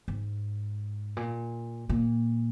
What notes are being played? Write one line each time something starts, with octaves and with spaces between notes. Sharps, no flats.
G#2
A#2
A#2